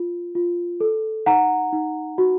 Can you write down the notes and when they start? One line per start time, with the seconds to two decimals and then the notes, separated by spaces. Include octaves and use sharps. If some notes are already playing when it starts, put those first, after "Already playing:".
Already playing: F4
0.35 F4
0.80 A4
1.26 D#4 F#5 A#5
1.72 D#4
2.18 F#4